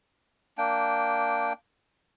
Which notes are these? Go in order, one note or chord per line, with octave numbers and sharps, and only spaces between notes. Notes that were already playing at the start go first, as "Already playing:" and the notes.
A#3 D4 G5